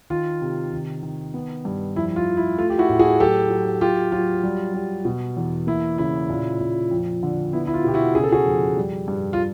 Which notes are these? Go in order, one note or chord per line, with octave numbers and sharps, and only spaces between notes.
D#3 F4
C3
D#3
D#3
B3
G2
F2 E4
F4
F3
E4
A3 F4
G4
E4 F#4
A2
F#4 G#4
F#3 G4 A4
F#3
F#3 F4 G4
F#3 F4
G3
G3
B2
E2
A#3 E4
C#3 E4
A#2
A#2
F2
D3
B3 E4
E4
F4
B2 G4
E4 F#4
C#3 G#4
A4
F#4 G#4
F2
G3
G2
F4